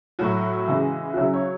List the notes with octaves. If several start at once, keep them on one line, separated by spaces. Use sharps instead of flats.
A2 F#3 F#4
C#3 E3 G#3
F#4
C#3 F#3 E4
C#5